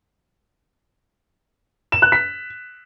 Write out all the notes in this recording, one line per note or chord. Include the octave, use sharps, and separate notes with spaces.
E7
F#6
B6